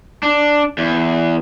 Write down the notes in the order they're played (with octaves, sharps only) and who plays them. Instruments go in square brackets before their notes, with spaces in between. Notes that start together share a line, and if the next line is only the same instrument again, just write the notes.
[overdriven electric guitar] D4
E2